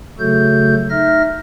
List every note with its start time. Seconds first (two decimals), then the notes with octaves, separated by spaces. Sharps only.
0.19 C#3 F#3 A3 F#4 A4 G6
0.90 D#4 E5 F6 A#6